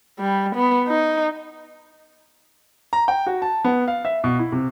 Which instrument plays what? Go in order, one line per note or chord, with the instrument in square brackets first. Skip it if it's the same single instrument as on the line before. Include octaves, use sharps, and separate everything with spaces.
[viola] G3
B3
D#4
[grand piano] A#5
G5
F#4
A5
B3
F5
E5
B2
E4
C3